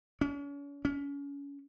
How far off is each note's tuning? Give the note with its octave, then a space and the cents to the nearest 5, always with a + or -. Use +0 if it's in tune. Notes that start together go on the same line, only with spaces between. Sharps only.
C#4 +40
C#4 +30